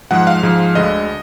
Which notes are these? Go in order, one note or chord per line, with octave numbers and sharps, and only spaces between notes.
G#2 F3 G#3 F#5
F5
G#2 F3 G#3
D2 D3 G#3 D#5